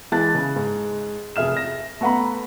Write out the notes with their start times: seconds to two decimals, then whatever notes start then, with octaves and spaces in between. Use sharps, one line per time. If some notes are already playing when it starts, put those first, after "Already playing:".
0.12 E3 G#3 A5 F#6 A6
0.35 C#3
0.56 G#2
1.36 F1 G#4 E5 F6 E7
1.57 A#6
2.01 A3 B3 F#5 A#5 B5